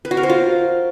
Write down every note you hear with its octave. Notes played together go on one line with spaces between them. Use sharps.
B4
F#4
A#4
C5
F4